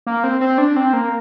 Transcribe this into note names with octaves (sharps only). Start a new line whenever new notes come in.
A#3
C4
C4
D4
C4
A#3